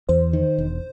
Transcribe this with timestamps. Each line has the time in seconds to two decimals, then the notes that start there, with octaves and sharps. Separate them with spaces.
0.09 E2 C5
0.33 D#3
0.58 E1